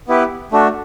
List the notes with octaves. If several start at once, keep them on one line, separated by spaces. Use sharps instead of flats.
B3 E4 G4 B4
A3 D4 F#4